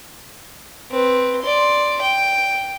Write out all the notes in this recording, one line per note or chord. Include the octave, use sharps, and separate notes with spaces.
C4 B4
D5 C6
G5